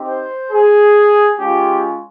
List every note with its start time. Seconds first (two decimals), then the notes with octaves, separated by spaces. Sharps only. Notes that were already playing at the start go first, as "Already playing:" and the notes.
Already playing: C4 D#4 G4
0.08 C5
0.52 G#4
1.38 G#3 C#4 F4 G4